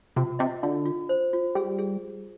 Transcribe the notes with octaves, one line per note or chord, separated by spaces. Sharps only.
C3 F4
C3 D#5
D3 F4
F4
C5
F4
G3 G#4
G#4